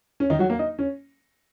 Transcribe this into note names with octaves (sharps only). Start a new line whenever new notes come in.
C#4
D#3 D#4
F#3 F#4
A#3 A#4
D#4 D#5
C#4